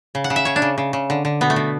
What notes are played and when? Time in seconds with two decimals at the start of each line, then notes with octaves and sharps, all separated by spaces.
0.15 C#3
0.24 F#5
0.30 C#3
0.36 E5
0.45 C#3 C#5
0.56 D4
0.62 C#3
0.78 C#3
0.93 C#3
1.10 D3
1.25 D3
1.41 B2 B3
1.50 A3
1.56 B2